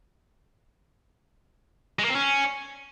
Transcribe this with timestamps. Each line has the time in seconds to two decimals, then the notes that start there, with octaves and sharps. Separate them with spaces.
1.99 G#3
2.04 A#3
2.10 C4
2.15 C#4